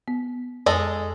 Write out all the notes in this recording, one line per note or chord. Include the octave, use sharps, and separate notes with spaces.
B3
F2 G#3 A4 D#5